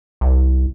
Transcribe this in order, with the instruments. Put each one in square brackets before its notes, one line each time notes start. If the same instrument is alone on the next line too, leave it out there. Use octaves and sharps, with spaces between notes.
[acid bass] C2